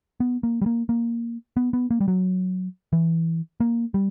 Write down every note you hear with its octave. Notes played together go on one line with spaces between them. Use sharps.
B3
A#3
G3
A#3
A#3
B3
B3
A#3
G3
F#3
E3
A#3
G3